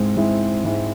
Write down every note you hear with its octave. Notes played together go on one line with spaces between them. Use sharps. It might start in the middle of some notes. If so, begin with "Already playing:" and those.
Already playing: G#2 G#3 C4 E4
G#2 G#3 C4 E4
G#2 G#3 C4 E4